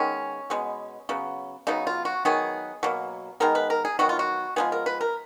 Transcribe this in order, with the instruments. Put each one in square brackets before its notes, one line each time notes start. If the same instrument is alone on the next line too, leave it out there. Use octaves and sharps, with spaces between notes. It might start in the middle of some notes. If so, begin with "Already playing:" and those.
Already playing: [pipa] D#3 G#3 B3 C#4
B2 G#3 B3
C#3 F#3 B3
C#3 F#3 B3 D#4
F4
F#4
D#3 F#3 B3 G#4
B2 F#3 A#3
D#3 G#3 B3 A#4
B4
A#4
G#4
D#3 F#3 B3 F#4
F4
F#4
F3 G#3 B3 G#4
A#4
B4
A#4